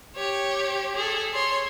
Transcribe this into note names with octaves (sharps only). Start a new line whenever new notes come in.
G4 C#5
G#4 A4
C#5 C6